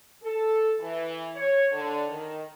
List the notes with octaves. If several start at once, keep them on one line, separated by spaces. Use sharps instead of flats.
A4
E3
C#5
D3
D#3